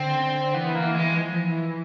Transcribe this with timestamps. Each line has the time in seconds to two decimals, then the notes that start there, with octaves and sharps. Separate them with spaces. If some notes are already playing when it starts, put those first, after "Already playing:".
Already playing: D3 C4
0.54 E3 B3
0.75 A#3
0.94 G#3
1.16 F3
1.47 E3